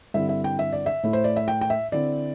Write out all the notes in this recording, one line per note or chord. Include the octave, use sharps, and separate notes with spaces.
G2 D3 C4 E4 E5
E5
G5
E5
D5
E5
A2 A3 E4
C5
D5
E5
G5
G5
E5
D3 C4 E4 D5